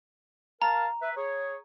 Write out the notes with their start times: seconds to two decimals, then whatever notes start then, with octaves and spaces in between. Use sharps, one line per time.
0.62 A#4 F5 A5 A#5
1.01 B4 E5
1.16 G#4 C#5